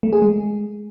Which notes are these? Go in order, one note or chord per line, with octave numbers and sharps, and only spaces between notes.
A3
G#4
G#3